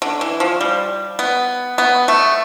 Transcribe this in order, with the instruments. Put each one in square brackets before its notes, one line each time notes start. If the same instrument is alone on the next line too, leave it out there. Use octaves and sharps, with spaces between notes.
[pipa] D3
E3
F3
G3
B3
B3
A3